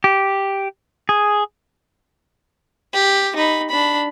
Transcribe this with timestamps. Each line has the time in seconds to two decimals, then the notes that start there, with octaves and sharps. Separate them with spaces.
0.04 G4
1.09 G#4
2.94 G4
3.36 D#4 B5
3.70 D4 B5